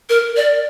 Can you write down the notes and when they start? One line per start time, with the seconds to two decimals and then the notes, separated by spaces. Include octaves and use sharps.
0.10 A#4
0.37 D5